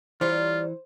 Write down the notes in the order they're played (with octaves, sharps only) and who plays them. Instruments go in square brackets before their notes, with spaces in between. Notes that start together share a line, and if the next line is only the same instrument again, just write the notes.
[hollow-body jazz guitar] E3 [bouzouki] G3 A#4 C#5 [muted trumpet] F4 [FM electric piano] C5